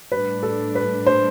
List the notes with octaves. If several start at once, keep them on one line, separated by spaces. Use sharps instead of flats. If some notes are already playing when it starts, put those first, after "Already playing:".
A2 G3 D4 B4
A4
B4
C5